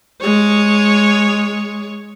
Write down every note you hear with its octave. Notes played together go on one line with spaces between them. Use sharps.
G#3 C#5